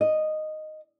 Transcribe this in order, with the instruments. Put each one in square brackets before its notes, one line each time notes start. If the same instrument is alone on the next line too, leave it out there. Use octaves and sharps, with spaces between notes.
[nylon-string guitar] D#5